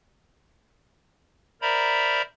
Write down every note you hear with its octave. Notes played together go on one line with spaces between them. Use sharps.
A#4 C5 D5 E5 A#5 B5